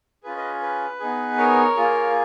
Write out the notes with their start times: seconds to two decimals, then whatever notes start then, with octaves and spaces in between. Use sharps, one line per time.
0.24 C#4 F4 G#4 B4
0.36 B4 D#5
0.62 B4
1.00 B3 D#4 G#4
1.38 A#4 C#5
1.76 A#3 F4 G#4